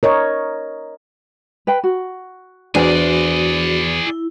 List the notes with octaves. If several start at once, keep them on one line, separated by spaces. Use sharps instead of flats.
A#4 C#5 D#5
B4 G5
F#4
E2 D4 F#4 G#4 C5 D5 G#5
E4